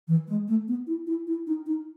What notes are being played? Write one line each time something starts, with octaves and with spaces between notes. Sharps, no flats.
E3
G#3
A3
B3
E4
E4
E4
D#4
D#4